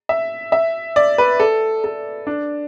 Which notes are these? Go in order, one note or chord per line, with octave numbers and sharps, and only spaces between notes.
E5
E5
D5
B4
A4
A4
D4